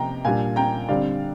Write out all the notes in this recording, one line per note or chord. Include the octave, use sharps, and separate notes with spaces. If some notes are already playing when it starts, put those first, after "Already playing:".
Already playing: C3 F3 A#3 G5 A#5
A#2 G3 D4 F5 G#5
G5 A#5
D3 G3 C4 D5 F5